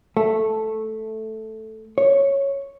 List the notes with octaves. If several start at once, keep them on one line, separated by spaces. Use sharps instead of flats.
A3
C#5